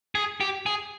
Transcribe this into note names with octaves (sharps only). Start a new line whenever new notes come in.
G#4
G4
G#4